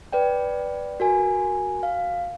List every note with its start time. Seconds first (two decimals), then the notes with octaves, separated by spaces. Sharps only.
0.13 B4 D5 G5
1.00 F#4 A#4 G#5
1.83 F5